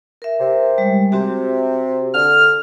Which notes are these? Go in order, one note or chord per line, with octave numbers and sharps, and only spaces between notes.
A#4 E5
C3
G3 G#3
C3 C4 F#4 G4
D3 F6